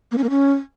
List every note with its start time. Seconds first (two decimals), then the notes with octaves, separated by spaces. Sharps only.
0.12 A#3
0.18 C#4
0.24 A#3
0.30 C#4